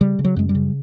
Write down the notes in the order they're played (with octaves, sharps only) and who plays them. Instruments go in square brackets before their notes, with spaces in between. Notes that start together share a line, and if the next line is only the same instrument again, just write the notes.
[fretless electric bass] C#3 G3
C#3
F#3
F#2 G#3
G3
C#3